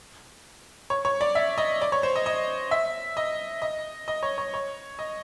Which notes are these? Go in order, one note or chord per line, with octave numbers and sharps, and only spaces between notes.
C#5
C#5
D5
E5
D#5
D5
C#5
C5
D#5
D#5
E5
D#5
D#5
D#5
C#5
C#5
C#5
D#5